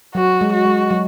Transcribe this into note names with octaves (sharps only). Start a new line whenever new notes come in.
F#3 F#4
G#3
F#4
G#3
F#3